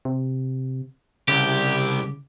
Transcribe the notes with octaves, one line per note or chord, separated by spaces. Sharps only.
C3
C2 C#3 G4